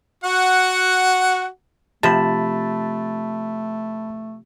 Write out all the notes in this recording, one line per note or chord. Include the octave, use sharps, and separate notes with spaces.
F#4 F#5
C3 F3 A3 A5 B5